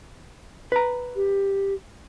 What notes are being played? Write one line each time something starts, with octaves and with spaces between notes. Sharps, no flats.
B4 A#5
G4